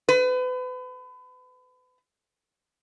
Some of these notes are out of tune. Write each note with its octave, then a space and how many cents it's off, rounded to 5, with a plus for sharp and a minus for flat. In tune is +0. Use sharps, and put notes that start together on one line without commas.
B4 +35